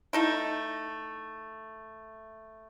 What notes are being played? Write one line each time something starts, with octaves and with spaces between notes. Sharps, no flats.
A3 D#4 E4